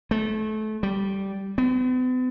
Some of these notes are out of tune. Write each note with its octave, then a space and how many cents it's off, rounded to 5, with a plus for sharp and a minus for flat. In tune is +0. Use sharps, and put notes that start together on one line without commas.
A3 -25
G3 -10
B3 +45